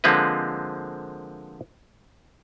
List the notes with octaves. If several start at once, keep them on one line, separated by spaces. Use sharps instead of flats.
D3 F3 G#3 A#3 C4 B4